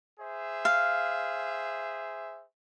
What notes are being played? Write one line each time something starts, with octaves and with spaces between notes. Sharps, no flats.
G#4 C5 E5
F5